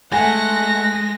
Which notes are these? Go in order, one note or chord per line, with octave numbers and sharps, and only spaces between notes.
G#3 A3 F#5 G#5 A#6